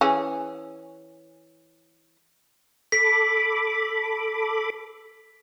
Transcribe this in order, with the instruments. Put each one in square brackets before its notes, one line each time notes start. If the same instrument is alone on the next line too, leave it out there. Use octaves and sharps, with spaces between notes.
[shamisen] E3 C#4 G#4
[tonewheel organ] A4 B5 D6 [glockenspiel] B6